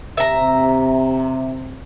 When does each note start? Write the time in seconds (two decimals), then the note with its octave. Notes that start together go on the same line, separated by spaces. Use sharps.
0.17 C3 E5 A#5